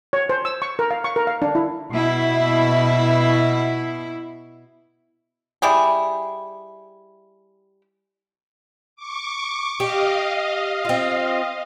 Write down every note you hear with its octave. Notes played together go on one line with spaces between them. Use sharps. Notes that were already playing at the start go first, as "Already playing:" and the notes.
C#5
C5
E6
C#6
A#4
F5
C#6
A#4
F5
D4
E4
B2 E4
G3 E4 G4 G#4
C#6 D6
G4 D#5 F5
C4 F4